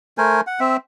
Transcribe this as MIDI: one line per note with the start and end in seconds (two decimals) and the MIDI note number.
0.18 0.41 57
0.18 0.41 70
0.18 0.41 72
0.18 0.41 80
0.47 0.60 78
0.60 0.77 60
0.60 0.77 76